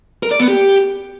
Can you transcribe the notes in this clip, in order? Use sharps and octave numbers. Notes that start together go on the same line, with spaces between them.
A#4
D5
B3
G4